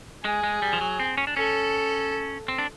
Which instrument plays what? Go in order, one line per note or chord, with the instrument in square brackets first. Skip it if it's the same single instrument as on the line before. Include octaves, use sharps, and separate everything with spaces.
[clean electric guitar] G#3 [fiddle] G#4
[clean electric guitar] G#3
G3
F3
F#3
C4
C#4
D4
[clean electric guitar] C#4 [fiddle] A4
[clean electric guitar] C4
D4